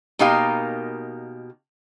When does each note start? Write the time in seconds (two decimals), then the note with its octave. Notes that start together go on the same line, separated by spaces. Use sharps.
0.19 B2 A#3 D#4 G4 A#4 F5